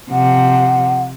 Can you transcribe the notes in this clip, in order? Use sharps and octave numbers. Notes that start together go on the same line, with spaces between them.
C3 F3 F#5